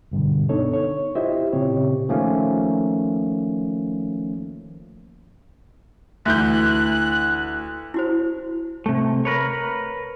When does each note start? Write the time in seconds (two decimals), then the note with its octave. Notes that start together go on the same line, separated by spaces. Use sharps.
0.12 C2 G2 B2 D3
0.49 B3 D4 D#4 A4 C#5
0.74 C#5
1.15 E4 F4 G4 C5 D#5 E5
1.53 A#2 C#3 C4 G4 C#5
2.09 D#3 F3 A3 A#3 C#4
6.25 D2 E3 F#6 G6
7.94 E4 F#4 C5
8.86 C3 A3
9.25 A#4 B4 C#5